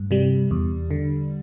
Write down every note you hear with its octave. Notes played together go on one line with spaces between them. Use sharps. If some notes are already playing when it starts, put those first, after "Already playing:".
Already playing: G2
C3 G3
E2
D3